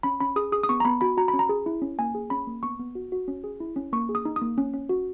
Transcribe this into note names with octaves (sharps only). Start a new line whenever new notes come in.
C#4 B5
C#4 B5
G#4 D#6
G#4 D#6
D#6
B3 C#6
A#5
B3 B5
F#4 B5
F#4 A#5
B5
C#4
A#5
G#4
E4
C#4
A#3 G#5
G#4
C#4 B5
A#3
B3 C#6
B3
F#4
F#4
C#4
G#4
E4
C#4
A#3 C#6
G#4
D#6
D#4
D#6
A#3
C#4
C#4
F#4